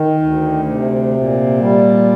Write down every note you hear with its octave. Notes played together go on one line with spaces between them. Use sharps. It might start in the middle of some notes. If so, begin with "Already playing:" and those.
Already playing: D#3
D2
C3
A#2
G3